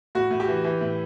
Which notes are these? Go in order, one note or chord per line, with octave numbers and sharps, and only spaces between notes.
A2 F#4
A2
G4
E3
E3
A2